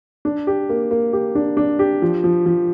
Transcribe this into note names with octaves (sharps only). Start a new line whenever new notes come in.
D4
G4
A#3
A#3
G4
D4
D4
G4
F3
F3
F3